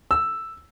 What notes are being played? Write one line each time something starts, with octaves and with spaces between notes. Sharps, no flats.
E6